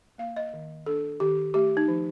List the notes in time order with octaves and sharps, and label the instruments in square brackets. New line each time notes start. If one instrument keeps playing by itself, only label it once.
[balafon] A#3 F5
D#5
D#3
D4 A4
D#3 G4
A3 G4
D#4
F3